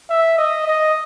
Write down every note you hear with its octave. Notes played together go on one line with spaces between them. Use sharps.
E5
D#5
D#5